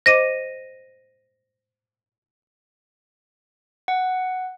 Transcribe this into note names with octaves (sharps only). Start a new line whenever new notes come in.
C5 D#5 D6 A#6 D#7
F#5